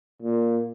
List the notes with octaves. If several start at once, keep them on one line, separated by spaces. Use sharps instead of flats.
A#2